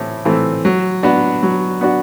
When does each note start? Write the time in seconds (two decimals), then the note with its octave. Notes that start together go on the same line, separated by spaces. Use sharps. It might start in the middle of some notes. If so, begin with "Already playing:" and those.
Already playing: A2 E3 C4
0.25 E3 A3 C4
0.65 F#3
1.03 B3 D4 F#4
1.43 F#3
1.81 B3 D4 F#4